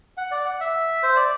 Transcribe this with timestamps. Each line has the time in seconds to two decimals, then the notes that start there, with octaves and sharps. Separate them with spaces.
0.17 F#5
0.31 D5
0.45 F#5
0.60 E5
1.03 C5
1.16 D5